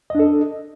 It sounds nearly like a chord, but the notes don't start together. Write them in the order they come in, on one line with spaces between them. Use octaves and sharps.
D#5 D4 A4